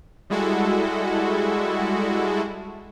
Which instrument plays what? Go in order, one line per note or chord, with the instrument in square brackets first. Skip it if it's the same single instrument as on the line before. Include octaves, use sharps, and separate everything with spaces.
[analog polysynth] G3 G#3 E4 F#4 A4